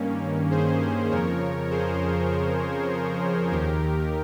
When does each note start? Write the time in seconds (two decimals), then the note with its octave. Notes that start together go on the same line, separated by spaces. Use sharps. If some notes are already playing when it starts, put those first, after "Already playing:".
Already playing: G2 D#3 A#3 C#4
0.50 G#4 C5
1.10 F2 C#3 F3 A#4 C#5
1.70 G#4 C5
3.51 D#2 D#3 G4 A#4